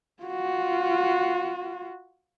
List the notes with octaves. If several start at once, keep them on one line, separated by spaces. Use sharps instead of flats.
F4 F#4